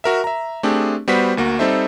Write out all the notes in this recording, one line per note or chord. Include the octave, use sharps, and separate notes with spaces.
F#4 A#4 E5
E5 A#5
A3 C4 D4 G4 G#4
G3 B3 F#4 C5 B6
D2 A#3 F#4
G3 C4 D#4 A4 C5 E5